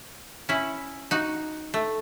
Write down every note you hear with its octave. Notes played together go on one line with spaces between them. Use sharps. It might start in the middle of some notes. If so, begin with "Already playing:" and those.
C#4 E4
D#4 F#4
A3